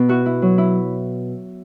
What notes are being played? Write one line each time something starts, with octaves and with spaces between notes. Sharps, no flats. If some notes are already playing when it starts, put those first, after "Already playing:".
Already playing: B2 B3
E4 F#4
E4
F#3
E4